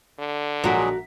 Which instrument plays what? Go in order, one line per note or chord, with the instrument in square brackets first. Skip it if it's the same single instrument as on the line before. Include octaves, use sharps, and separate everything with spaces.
[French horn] D3
[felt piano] A#1 F#5 B6 [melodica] F#3 G#3 G#4 [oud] F#4 A#4